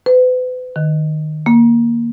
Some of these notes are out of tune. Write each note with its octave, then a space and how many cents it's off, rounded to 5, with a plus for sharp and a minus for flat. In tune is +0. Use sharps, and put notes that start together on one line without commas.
B4 +40
D#3 -20
A#3 +5